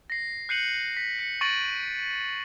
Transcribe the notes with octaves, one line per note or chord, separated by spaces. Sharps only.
A#6 C7
F#6 G6 C7 C#7 D#7 F#7
B6
C#7
C#6 A6 A#6 D7 D#7 F#7